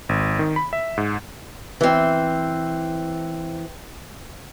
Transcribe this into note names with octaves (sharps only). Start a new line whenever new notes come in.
G#1
D#3
B5
E5
G#2
E3 C4